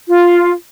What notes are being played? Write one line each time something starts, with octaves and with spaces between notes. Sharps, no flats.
F4